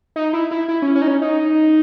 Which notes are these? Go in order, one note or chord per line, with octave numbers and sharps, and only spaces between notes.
D#4
E4
E4
E4
C#4
C#4
D#4
C#4
D#4